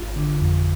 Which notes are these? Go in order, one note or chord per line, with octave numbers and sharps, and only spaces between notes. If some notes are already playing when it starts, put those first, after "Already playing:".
Already playing: G#1 F4
D3
F2